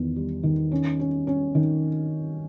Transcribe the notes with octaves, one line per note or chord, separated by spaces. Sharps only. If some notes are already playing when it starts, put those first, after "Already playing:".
Already playing: E2 D#3
G3
D#3
C#4
C#4
C#4
D#3